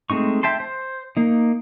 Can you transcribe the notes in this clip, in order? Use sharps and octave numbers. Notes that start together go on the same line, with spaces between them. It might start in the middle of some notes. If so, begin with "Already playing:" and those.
G#3 A3 C4 D#4 C#6
E5 G5 A5 C6
C5
A#3 D#4